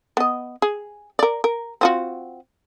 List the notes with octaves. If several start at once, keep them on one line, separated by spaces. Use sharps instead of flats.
B3 D#5
G#4
A#4 D5
A#4
C4 F4 F#4